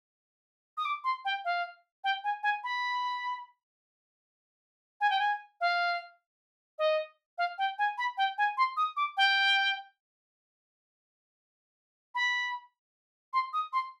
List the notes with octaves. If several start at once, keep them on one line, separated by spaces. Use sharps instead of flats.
D#6
D6
C6
G5
F5
G5
G#5
G#5
B5
G#5
G5
G#5
F5
D#5
F5
G5
G#5
B5
G5
G#5
C6
D#6
D6
G5
B5
C6
D#6
C6